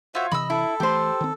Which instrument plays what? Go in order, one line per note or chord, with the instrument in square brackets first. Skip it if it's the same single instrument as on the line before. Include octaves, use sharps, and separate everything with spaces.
[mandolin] F4 C#5 [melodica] F#4 C5 E5
[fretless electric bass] C3 E3 [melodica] D#5 [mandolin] B5 E6
[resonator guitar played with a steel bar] E4 [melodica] A4
[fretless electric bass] E3 A3 [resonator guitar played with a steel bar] G4 C5
[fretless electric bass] D#3 C4